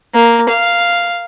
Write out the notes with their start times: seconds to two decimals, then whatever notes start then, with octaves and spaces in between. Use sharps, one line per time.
0.14 A#3
0.49 F5